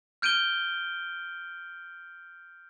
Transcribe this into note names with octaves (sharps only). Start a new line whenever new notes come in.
F6 G6 D7 D#7 G7